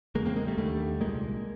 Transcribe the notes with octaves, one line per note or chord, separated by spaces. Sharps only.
E2 C#3 G#3 A#3
A#3 C4
G#3 A#3
G3 A3
D#2 D3 G3 A3
C2 A#2 G#3 A#3